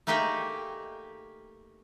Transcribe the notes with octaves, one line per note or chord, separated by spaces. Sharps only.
A3 A#3 D#4 G4 G#4 G5